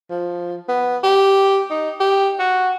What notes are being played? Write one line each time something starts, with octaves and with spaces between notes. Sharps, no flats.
F3
B3
G4
D#4
G4
F#4